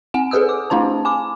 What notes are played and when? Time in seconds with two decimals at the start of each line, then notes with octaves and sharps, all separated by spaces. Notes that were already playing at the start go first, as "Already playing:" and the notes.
0.14 C4 F#5 G#5
0.31 G#4 A4 B4 D#6 E6
0.49 D6
0.70 A3 D4 E4 C5 A5
1.05 G#5 D6